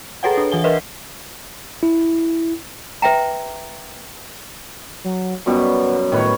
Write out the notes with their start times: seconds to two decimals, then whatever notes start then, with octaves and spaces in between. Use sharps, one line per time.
0.23 G#4 A4 B4 C#5 F#5 G5
0.38 D4
0.52 E3 F#5 G#5 G7
0.64 A#4 B4 D#5 E5
1.83 E4
3.02 B4 E5 G5 A#5
5.04 F#3
5.46 F#2 B2 G3 B3
6.12 A2 D#3 B4 C#5